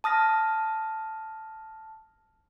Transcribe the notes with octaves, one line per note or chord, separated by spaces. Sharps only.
A5 D#6 F6 A#6